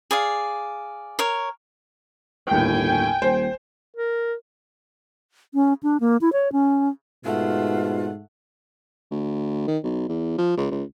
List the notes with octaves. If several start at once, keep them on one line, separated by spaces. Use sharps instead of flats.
G#4 D5 F5
A#4 C#5
G1 D#2 A2 G5 G#5
D#1 C5
A#4
C#4
D4
A#3
E4
C#5
C#4
G#2 B2 A3 F4 F#5
D2
D#3
B1
E2
F3
C#2
C#2